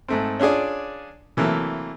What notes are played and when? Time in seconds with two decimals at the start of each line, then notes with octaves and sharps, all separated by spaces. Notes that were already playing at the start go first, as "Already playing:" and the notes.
0.09 G#2 A3 C4
0.40 C#4 D4 F4 G#4 D5
1.37 C3 E3 F#3 A3 A#3